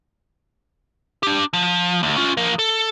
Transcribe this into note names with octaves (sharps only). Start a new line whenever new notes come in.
D4 G4
F3
D2
C#4 F4
F3 A#4
A4